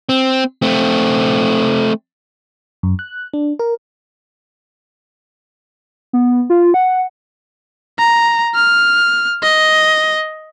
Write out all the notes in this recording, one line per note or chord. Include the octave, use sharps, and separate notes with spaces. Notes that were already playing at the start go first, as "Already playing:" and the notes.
C4
A3 C4
F#2
F#6
D4
A#4
B3
F4
F#5
A#5
F6
D#5